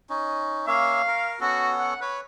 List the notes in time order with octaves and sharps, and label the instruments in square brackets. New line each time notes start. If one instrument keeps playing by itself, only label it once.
[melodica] C#4 D#4
[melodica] A#3 C#4 E5 [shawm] F5
[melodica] A#4
[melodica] B3 C#4 A4 [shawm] F#4
[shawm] F#5
[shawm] B4 [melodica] C#5